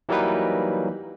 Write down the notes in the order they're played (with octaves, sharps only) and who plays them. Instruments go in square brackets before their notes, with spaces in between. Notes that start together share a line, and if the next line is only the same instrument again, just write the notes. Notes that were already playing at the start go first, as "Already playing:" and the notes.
[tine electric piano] E3 F#3 G3 A#3 D#4 B4